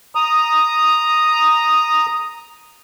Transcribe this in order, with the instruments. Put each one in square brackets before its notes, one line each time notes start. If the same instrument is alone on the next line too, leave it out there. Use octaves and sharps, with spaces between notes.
[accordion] A#5 D#6